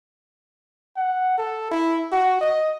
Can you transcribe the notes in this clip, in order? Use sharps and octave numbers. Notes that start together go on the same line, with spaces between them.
F#5
A4
E4
F#4
D#5